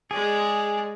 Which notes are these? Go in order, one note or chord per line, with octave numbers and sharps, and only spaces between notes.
G#3 G#4 D5